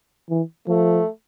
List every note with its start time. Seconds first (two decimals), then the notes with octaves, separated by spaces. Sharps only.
0.30 E3
0.68 F3 A3